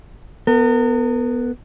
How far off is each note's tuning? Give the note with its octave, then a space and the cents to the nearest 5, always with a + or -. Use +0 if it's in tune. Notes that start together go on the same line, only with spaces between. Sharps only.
B3 +0 A#4 -45